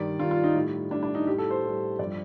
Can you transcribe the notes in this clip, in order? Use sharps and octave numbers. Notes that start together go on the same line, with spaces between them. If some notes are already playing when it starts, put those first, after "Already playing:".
Already playing: G2 D#3 G3 D5
G2 D#3 G3 F4
F4
D#4
A2 G3
A2 G3 D4
D4
D#4
A2 G3 G4
A4
C5
A2 G3
G2 F3 D5